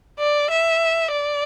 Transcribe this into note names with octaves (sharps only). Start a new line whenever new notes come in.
D5
E5
D5